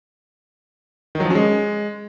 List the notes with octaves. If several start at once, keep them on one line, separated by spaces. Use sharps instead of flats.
D#3
F#3
F3
C#4
G#3